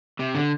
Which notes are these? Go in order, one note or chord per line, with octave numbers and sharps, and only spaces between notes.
C3
D3